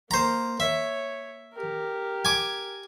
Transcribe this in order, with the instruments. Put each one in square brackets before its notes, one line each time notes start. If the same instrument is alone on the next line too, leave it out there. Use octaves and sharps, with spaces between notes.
[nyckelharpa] A#3 [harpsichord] C5 A#5
[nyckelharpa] C#5 [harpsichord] E5
[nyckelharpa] G4 A#4
[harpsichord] G#5 D6